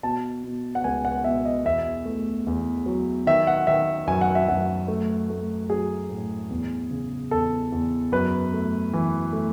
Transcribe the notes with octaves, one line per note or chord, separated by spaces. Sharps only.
B2 A5
B2
F#5
C#2 G#5
F#5
B2 E5
D#5
E2 E5
A3
E2
F#3
D#3 E5
F#5
D#3 E5
F#2 G#5
F#5
E5
F#2 F#5
A3
A3
F#3 G#4
A2
E2
C#3
E2 A4
E2
F#2 B4
A3
E3
A3